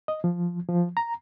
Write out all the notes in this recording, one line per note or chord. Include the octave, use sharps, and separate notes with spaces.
D#5
F3
F3
A#5